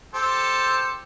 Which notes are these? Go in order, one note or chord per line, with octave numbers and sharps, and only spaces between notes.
G4 A4 C5